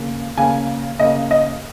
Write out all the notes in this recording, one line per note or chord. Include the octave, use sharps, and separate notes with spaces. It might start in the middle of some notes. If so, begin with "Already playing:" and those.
Already playing: C#3 A#3
C#3 A#3 G#5
C#3 A#3 D#5
D#5